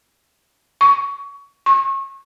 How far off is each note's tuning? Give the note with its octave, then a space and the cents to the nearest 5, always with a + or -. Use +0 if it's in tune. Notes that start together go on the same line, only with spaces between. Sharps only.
C#6 +25
C#6 -35